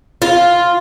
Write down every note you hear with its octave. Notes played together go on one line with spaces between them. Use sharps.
F4